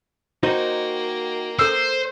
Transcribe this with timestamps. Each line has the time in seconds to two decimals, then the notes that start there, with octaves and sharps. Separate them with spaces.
0.43 A#3 D#4 F#4 C5 G5
1.59 A4 C5 E6